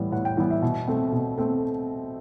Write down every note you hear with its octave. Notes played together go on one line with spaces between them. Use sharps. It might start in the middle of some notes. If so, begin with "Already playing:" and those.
Already playing: A2 E3 G3 B3
A2 F#5
G5
E3 G3 B3 F#5
E5
B2
A3 C4
B2
A3 C4